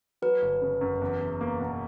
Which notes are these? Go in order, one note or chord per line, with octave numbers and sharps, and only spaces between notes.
F#3 B4
G1
C#3
F#2
E2
E2
A#3
B2